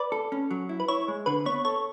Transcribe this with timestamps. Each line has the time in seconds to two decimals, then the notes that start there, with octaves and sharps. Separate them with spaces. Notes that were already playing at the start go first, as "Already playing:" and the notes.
Already playing: B4 D5
0.12 A4
0.32 C#4
0.51 F#3
0.69 E4
0.80 B4
0.88 E4 C#5
1.08 G#3
1.26 D3 B4
1.46 B3 C#5
1.65 A4 C#5